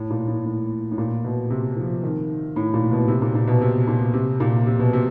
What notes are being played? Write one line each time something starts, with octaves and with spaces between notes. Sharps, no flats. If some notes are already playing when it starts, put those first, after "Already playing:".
Already playing: A2
A#2
A2
A2
A2
A#2
B2
C3
F3
D#3
A2
A#2
B2
C3
A#2
A#2
B2
C3
A#2
C3
A#2
C3
B2
C3